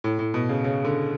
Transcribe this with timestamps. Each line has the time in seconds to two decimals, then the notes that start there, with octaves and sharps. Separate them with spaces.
0.04 A2
0.19 A2
0.34 B2
0.49 C#3
0.64 C#3
0.84 D3